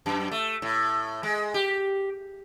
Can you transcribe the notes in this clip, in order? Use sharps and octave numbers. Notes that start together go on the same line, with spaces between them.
F#2
A3
A2
G#3
G4